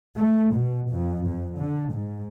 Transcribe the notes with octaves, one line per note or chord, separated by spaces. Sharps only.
A3
B2
F2
F2
D3
G#2